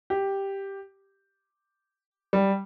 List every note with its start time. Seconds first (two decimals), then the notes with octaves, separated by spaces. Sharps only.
0.10 G4
2.33 G3